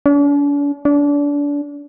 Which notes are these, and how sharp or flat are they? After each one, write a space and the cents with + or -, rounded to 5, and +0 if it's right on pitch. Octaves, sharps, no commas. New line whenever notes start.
D4 -45
D4 -30